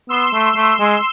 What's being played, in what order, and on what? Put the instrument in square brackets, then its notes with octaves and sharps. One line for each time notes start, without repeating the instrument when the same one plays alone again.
[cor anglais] B3 [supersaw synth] C6 E6
[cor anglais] A3
A3
G#3